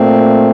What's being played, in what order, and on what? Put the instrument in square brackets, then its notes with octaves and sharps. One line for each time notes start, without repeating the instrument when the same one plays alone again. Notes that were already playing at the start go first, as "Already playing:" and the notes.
Already playing: [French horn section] A#2 A3 C4